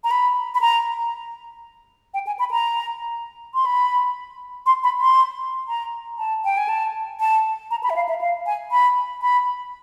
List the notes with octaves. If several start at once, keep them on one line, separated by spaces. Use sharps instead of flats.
A#5
B5
B5
A#5
G5
G#5
B5
A#5
C6
B5
C6
B5
C6
A#5
A5
G5
G#5
A5
A5
A#5
B5
E5
F5
E5
F5
G#5
B5
B5